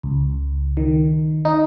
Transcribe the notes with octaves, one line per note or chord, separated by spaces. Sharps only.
C#2
D#3
D#4